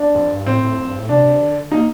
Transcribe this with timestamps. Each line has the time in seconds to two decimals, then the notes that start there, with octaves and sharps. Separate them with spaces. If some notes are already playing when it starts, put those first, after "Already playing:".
Already playing: D4
0.15 F2
0.31 G2
0.46 A2 C4
0.63 A2
0.78 F2
0.88 G2
0.98 A2
1.09 C3 D4
1.24 C3
1.40 D3
1.71 A#3 D#4